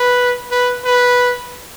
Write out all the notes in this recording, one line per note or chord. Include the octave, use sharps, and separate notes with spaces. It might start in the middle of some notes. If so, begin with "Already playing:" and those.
Already playing: B4
B4
B4